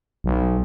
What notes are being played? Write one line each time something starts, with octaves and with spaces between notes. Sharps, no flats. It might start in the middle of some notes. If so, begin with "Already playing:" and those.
B1